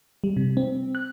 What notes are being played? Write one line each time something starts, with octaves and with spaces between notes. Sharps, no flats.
G3
C3
C4
F#6